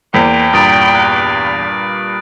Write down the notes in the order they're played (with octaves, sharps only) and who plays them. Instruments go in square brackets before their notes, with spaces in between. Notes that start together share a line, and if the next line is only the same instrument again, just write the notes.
[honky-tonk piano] E2 [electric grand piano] A#3 C5 B6 [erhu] G5
[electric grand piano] G2 A#2 A#5 [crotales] D#6 A6 D7
[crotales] F#6